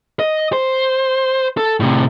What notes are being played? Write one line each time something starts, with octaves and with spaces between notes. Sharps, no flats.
D#5
C5
A4
A2 C3